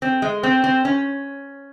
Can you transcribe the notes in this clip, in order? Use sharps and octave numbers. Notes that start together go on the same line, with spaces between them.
C4
G#3
C4
C4
C#4